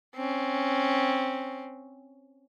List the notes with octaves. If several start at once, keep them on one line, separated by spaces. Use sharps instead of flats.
C4 C#4